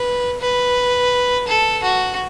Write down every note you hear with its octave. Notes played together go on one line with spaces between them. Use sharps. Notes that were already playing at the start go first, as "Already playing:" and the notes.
Already playing: B4
B4
A4
F#4